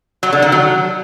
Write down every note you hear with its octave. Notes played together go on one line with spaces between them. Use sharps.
F#3
D3
D#3
F#3